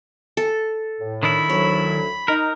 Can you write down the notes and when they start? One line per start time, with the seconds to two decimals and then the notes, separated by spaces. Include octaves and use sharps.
0.37 A4
1.00 A2
1.23 D#3 D4 E4 B5
1.50 D2 F#3 C#5
2.28 D#4 A#4